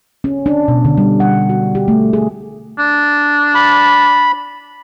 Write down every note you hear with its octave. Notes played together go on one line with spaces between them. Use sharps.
C#4
D4
B2
D3
G3
F#5
F#4
G4
A3
G#4
D4
B5